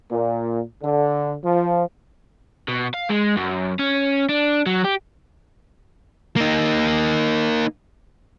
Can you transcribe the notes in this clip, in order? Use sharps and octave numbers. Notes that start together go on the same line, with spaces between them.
A#2
D3
F3
B2
F5
G#3
F#2
C#4
D4
F#3
G4
A#3 D#4